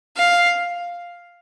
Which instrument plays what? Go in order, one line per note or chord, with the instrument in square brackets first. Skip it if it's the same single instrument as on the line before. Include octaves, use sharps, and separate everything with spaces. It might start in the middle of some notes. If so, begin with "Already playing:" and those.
[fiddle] F5